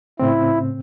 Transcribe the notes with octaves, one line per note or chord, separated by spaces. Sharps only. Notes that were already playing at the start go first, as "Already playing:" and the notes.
A2 C#3 C4 E4